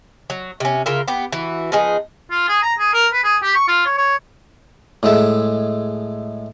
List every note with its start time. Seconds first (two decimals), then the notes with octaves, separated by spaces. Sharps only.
0.30 F#3
0.60 C3 C#4
0.86 C#3 F4 A#4 E5
1.08 B3 G4
1.32 E3 F#4
1.72 F3 B3 D#4 G#4
2.31 F4
2.49 G#4
2.63 A#5
2.78 G#4
2.93 A#4
3.13 B4
3.24 G#4
3.43 G4
3.55 C#6
3.68 F4
3.86 C#5
3.97 C#5
5.03 A2 G#3 E5